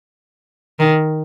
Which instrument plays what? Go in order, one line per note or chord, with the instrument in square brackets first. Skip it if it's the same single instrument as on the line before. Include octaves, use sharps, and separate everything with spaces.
[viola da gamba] D#3